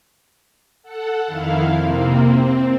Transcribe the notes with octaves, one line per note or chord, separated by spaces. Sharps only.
A4 F#5
F2 D#3 E4 F5
C3 A#3 C4
C4